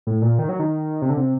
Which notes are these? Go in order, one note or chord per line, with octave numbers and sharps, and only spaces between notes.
A2
A#2
D#3
F#3
D#3
C3
D3
C3